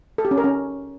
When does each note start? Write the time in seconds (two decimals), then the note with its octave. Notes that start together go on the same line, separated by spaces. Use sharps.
0.18 A4
0.25 G4
0.31 C#4
0.38 A#4
0.44 C#4